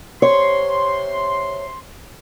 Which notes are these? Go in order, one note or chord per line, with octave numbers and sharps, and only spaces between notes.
C3 C#5 C6